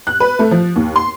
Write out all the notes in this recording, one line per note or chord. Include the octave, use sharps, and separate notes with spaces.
F#6
B4
A3
F3
D#2
C6